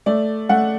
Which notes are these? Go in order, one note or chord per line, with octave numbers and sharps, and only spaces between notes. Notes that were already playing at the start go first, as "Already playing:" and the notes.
A3 D5
A3 F#5